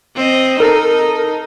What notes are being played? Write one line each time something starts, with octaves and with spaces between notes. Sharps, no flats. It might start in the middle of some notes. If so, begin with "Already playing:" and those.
C4 D#5
D#4 A4 A#4